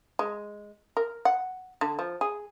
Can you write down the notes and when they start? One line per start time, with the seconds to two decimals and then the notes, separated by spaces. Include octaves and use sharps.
0.19 G#3
0.97 A#4
1.25 F#5
1.81 D3
1.99 F3
2.21 G#4